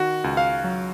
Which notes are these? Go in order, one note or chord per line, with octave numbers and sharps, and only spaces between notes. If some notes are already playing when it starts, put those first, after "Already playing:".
Already playing: D#3 F#4
C#2
F5
F#3